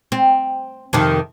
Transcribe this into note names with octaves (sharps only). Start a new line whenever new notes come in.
C4
F2 C3 D#3